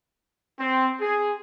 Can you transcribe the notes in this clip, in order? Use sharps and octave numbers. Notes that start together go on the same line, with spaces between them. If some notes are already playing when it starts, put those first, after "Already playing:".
C4
G#4